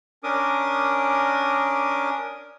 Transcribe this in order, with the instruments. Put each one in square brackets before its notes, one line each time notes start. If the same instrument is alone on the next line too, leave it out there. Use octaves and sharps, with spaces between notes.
[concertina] C#4 D4 A#4 D6 D#6